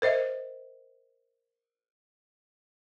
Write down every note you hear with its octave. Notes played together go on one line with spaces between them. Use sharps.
A#4 C5 D#5 E5